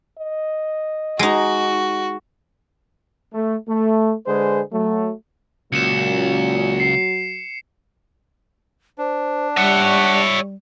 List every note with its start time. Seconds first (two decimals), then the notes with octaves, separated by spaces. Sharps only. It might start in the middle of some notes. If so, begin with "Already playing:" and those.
0.18 D#5
1.19 G#3 D#4 F#4
3.34 A3
3.68 A3
4.26 D3 G#3 G#4 B4 C5
4.72 F#3 A3
5.73 C#2 A#2 F#3 C#4 C#7 E7
6.80 C7
8.98 D4 C5
9.57 G3 C#5 E5 F#5